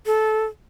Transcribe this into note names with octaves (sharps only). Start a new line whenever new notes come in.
A4